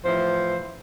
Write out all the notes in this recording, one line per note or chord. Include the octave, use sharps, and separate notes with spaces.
A2 E3 F3 C5